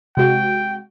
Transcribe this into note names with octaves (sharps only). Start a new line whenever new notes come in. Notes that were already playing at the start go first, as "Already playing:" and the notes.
C3 G#3 F#4 G5